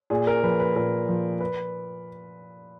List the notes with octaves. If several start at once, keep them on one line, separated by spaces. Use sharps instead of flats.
A#2 G#4
A#4
F3 B4
B4
A#2 A#4
F3
B4